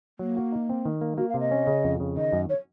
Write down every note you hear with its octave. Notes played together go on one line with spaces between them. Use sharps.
F#3 A#3
F#4
D#4
C4
D#3
A#3
A#3 F#4
F5
C3
D#5
C#4
C#3
F2
C#3
D#3 D#5
F#2
C#5